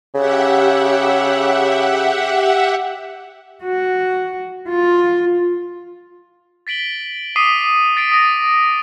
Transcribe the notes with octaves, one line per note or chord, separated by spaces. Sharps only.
C#3 G4 E5 F#5
F#4
F4
A6 B6 D7 F#7 G7
D6 D#6 B6 C7 D#7 G7
A6 B6 C7 D7
D#6 A#6 B6